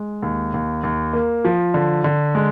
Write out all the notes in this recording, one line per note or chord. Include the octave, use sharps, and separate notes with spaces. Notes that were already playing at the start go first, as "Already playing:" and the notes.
Already playing: G#3
D#2
D#2
D#2
A#3
F3
D3
D3
G#3